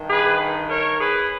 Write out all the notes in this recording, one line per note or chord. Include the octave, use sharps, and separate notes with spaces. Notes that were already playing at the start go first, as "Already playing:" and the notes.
Already playing: G2 D#3
G#4 B4
A#4 C#5
G#4 B4